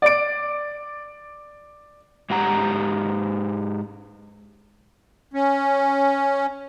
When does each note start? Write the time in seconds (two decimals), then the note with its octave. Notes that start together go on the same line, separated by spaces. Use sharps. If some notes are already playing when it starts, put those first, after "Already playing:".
0.02 D5 D7
2.30 G#2 G4 F#5 A#5
5.34 C#4